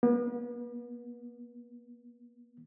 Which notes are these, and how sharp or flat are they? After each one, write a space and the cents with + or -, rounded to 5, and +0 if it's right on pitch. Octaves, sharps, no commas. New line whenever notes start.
B3 -35